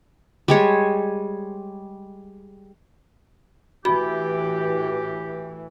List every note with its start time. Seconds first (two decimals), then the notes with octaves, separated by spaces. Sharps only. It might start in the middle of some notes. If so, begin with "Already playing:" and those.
0.48 G3 G#3 C#5
3.85 A2 E3 F#4 G4 B5